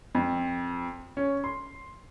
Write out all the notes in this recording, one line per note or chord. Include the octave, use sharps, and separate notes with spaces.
F2
C#4
C6